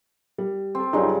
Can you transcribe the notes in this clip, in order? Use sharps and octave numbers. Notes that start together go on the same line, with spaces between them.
G3
C4 A4
G2 C#3 F#3 D#4 F4